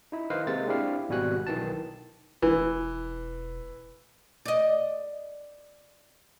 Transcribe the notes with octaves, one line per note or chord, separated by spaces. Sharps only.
D#4 E4
D#3 B4 C5 D#5 F5
C3 G#3 A#3 A6
C4 D4 E4 G4 F5
G#1 B2 G3 F#4 G#5 F#6
B1 D#3 E3 A5
E1 E3
D5 D#5